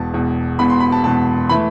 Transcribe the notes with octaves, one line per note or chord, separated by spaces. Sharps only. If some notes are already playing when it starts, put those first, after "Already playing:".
Already playing: E1 E2 B2 A5
E1 E2 B2
E1 E2 B2 B5
C6
B5
A5
E1 E2 B2 A5
E3 A3 B5